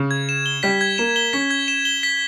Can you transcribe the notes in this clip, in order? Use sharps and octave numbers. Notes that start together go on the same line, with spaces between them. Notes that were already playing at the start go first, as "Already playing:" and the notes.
Already playing: C#3
G#6
E7
G7
G3 B6
G#6
A#3 E7
G7
C#4 B6
G#6
E7
G7
B6